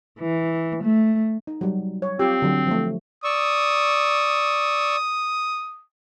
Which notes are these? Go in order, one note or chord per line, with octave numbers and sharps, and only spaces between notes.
E3
A3
D#4
F#3 G3
C#5
C4 F4 G4
D3 F#3
F3 A3
D5 C#6 D#6 E6